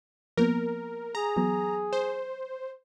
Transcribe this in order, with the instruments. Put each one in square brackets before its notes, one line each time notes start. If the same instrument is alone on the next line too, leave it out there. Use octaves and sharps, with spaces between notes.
[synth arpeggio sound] F3 A#3 B3 [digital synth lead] A#4
[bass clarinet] G#4 [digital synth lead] A#5
[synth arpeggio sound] E3 F#3 B3
[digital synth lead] C5